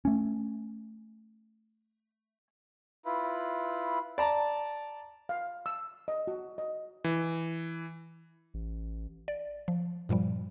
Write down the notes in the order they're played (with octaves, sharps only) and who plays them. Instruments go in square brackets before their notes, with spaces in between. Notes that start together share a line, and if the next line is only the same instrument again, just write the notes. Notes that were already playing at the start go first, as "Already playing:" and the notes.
[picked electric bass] A3 C#4
[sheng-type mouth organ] E4 F4 B4
[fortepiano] D5 A5 A#5
[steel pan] F5
E6
D#5
F#4
D#5
[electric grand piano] E3
[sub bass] A1
[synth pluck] D5
F3
G2 A#2 F3 G3